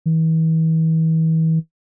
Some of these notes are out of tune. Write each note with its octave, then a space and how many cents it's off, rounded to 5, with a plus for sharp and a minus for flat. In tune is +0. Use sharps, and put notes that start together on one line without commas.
E3 -40